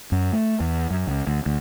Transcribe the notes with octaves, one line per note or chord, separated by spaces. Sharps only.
F#2
A3
E2
F#2
C#2
D2
D2